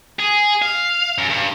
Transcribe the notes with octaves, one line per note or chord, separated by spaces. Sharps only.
G#4
F5
F#2
G2